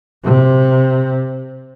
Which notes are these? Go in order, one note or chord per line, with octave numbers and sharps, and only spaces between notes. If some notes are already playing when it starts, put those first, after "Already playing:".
C3